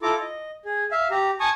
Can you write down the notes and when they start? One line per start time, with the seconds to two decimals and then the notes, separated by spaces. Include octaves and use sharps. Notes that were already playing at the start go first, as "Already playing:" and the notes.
0.02 E4 F4 A4 A#5 D6
0.20 D#5
0.65 G#4
0.91 E5 F5
1.11 G4 A#5
1.40 G#5 A5 C#6 D#6